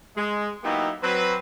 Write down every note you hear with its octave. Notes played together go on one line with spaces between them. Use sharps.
G#3
F#3 A#3 B3 D#4 E4 G4
F#3 C4 B4